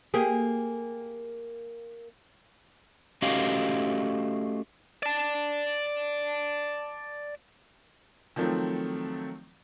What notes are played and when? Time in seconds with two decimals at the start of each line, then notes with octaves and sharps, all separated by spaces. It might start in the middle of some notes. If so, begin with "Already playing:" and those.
0.14 A#3 G4 G#4
3.22 A3 C#4 F#4 G4 D#5 F5
5.03 D5 A5
8.36 D#3 F3 F#3 A3 C4